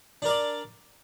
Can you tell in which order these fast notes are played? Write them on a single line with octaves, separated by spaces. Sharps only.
D4 A#4 D5